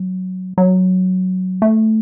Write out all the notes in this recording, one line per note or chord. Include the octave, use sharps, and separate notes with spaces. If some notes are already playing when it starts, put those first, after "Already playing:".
Already playing: F#3
F#3
A3